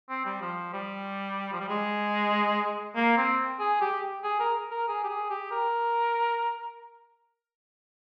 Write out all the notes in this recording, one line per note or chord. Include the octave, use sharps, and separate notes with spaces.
C4
G3
F3
G3
F3
G3
G#3
A#3
C4
G#4
G4
G#4
A#4
A#4
G#4
G4
G#4
G4
A#4